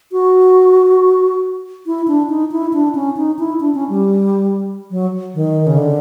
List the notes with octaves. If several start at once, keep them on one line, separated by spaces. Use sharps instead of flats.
F#4
E4
D4
D#4
E4
D4
C#4
D#4
E4
D4
C#4
G3
F#3
D#3
C#3
D3